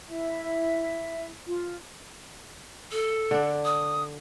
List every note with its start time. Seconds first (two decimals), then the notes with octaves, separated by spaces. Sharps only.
0.08 E4 E5
1.46 F4
2.92 A4
3.31 D3 D4
3.65 D#6